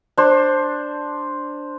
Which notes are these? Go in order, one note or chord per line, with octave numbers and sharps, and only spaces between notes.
D4 C5